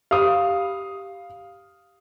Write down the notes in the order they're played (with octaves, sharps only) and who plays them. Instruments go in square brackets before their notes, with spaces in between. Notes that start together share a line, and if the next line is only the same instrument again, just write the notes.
[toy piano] G4 B5 [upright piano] F5 D#6